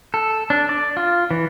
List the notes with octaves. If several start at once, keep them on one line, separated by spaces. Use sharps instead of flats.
A4
D4
D5
F4
E3